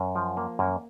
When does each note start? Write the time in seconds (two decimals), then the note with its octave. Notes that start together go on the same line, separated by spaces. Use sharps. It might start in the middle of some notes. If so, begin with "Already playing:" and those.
Already playing: F#2
0.16 F3
0.37 A#3
0.59 F#2